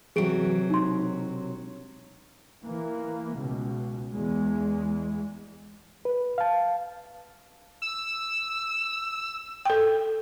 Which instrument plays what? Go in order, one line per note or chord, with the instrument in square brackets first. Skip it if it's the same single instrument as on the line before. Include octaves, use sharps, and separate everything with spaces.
[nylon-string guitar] C3 F#3 [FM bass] E3 [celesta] G#4 D7
[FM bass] E1 [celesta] D#4 C6
[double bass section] E3 A#3
C#2 B2
E2 G#3
[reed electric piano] B4
F5 A5
[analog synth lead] E6
[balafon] A4 G5